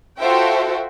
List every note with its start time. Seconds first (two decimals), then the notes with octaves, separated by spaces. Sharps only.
0.19 F4 F#4 A4 C5 E5 G5